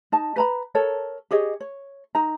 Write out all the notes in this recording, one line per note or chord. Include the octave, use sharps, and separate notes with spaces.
D#4 D#5 A5
B4 A#5 B5
A4 A#4 C#5
G4 G#4 C#5 D#5
C#5
D#4 A#5